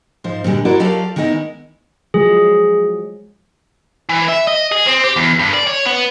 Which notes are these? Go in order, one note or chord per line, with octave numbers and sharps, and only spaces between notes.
G#2 F3 C5
A#2 D3 G3 G#3
E4 F#4 A#4 C5 D5
F#3 F4 G4 A4 D5 F5
D#3 G#3 B3 D#4 E4
F3 F#3 G#3 G#4
E3
E5
D#5
G#4
C4
G4
E2
G2
D5
C#5
B3